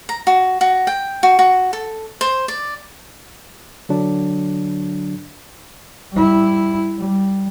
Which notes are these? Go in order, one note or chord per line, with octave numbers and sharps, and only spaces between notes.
A#5
F#4
F#4
G5
F#4
F#4
A4
C5
D5
D3 F#3 D4
G3 E4
G3